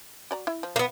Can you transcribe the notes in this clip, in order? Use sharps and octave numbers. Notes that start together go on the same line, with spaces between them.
F#4 D5 A#5
E4 E5
F3
A#3 B3